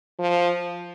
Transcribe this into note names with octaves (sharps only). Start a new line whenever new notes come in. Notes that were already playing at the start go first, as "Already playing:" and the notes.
F3